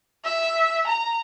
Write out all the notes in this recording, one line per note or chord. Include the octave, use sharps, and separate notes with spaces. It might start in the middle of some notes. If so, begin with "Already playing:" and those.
E5
A#5